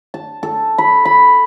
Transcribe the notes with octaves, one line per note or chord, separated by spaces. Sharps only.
A5
A4
B5
B5